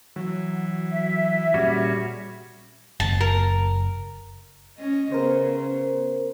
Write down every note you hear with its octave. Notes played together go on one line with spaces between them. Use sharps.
E3 F#3
E5
A#2 G3 C#4 F#4 G#4
F#1 A5
A#4
C#4 D#5
C#3 B3 A#4 C5